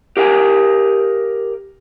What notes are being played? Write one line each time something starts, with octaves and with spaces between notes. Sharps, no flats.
G4 A#4 F5 G#5